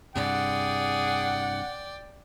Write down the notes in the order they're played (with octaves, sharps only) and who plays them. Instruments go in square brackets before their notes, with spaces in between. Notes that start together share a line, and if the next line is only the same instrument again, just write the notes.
[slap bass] G2 C3 [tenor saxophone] G#4 [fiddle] D5 G5 [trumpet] F#5